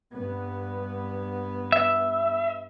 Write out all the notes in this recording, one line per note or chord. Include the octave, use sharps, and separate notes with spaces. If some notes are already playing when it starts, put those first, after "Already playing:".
G2 B3
E5